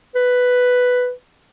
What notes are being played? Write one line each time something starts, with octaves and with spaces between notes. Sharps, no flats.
B4